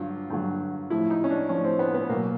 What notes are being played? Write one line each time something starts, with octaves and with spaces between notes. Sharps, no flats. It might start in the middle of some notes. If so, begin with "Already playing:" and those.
Already playing: G2 D3 F#3 F4
G2 D3 F#3
A2 F3 E4
D#4
C#4
D4
A2 F3 C#4
C4
B3
B3
B2 F#3 A#3